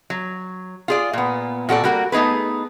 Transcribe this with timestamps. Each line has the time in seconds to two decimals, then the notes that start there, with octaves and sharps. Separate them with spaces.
0.10 F#3
0.88 F4 G#4 D5
1.13 A#2 B3
1.69 A#2 F#4 A4 D5
1.84 G3 A#3 F#4 A#4
2.12 A3 B3 D#4 G#4 B4